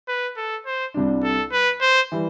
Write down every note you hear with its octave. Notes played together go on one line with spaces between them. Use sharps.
B4
A4
C5
C2 C3 G3 D4
A4
B4
C5
E3 G3